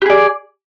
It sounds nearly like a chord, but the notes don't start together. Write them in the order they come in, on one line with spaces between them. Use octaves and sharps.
G4 G#4 D5